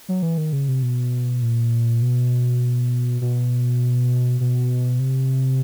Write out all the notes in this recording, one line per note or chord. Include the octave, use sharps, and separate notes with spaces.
F#3
E3
D#3
C#3
C3
B2
A#2
B2
B2
B2
C3